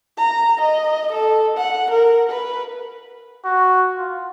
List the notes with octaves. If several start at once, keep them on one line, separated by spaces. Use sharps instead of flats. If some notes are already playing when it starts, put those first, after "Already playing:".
A#5
D#5
A4
F#5
A#4
B4
F#4
F4